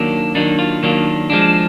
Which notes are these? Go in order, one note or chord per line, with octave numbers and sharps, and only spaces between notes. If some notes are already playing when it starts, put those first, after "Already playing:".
Already playing: D#3 F#3 A#3 D4
D#3 F#3 A#3 D4 D#4
F4
D#3 F#3 A#3 D4
F3 G#3 D4